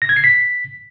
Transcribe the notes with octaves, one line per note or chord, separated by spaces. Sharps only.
A#6
G#6
C7
B6